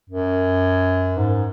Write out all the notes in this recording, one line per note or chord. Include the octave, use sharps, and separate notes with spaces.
F#2
G#2